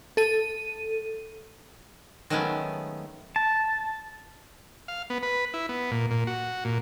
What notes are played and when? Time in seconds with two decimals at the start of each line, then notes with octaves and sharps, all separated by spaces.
0.17 A4 D#7
2.30 D#3 F#3 G#3 A3 B3 C#4
3.36 A5
4.88 F5
5.10 B3
5.23 B4
5.54 E4
5.69 B3
5.91 A#2
6.11 A#2
6.27 F#4
6.65 A#2